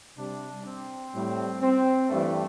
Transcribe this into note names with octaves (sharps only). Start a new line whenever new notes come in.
C3 G3 D4
C4
A2 G3
C4
G2 E3 G3 A3